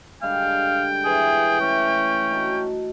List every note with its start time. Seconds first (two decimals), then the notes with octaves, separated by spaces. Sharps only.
0.23 D3 G3 G#3 F5 G5
1.05 E3 G#4
1.61 A3 C#4 D6
2.32 D#4 F#4 A4